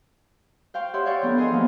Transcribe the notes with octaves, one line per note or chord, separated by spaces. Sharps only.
C5 F5 G5 C#6
G4 C#5 E5 F#5 C6
C#5 D5 F5 G5 C#6
F3 B3 D4 A4
G#4 C5 D#5 G#5 C6
E3 F3 A#3 B3